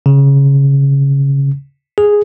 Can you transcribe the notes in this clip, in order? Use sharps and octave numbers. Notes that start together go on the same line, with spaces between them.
C#3
G#4